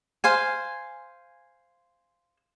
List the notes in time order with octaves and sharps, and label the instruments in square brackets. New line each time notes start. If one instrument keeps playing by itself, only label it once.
[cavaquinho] C5 F5 G#5